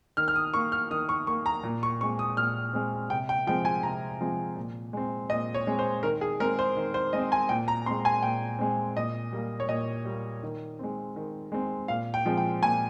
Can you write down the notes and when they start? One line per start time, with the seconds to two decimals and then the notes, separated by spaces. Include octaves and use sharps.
0.17 D#3 F6
0.28 F6
0.36 D#6
0.54 A#3 C#6
0.72 F6
0.91 D#3 D#6
1.09 C#6
1.27 A#3 C#6
1.46 A#5
1.63 A#2
1.83 C#6
2.01 G#3 C4 C#6
2.19 D#6
2.37 A#2 F6
2.73 G#3 C4
3.10 C3 G5
3.29 G5
3.47 F3 G#3 C4 G5
3.65 G#5
3.83 C3 A#5
4.20 F3 G#3 C4
4.56 A#2
4.93 G#3 C4
5.30 A#2 D#5
5.54 C#5
5.67 G#3 C4
5.79 C5
6.03 D#3 A#4
6.21 G#4
6.40 G#3 C4 A#4
6.59 C5
6.77 D#3
6.94 C5
7.13 G#3 C4 D#5
7.32 G#5
7.49 A#2 G5
7.68 A#5
7.86 G#3 C4 C6
8.05 G#5
8.23 A#2 G5
8.59 G#3 C4
8.96 A#2 D#5
9.33 G3 A#3
9.60 C#5
9.69 A#2 D#5
10.05 G3 A#3
10.43 D#3
10.79 G#3 C4
11.16 D#3
11.52 G#3 C4
11.88 A#2 F5
12.14 G5
12.26 F3 G#3 C4
12.38 G5
12.62 A#2 G#5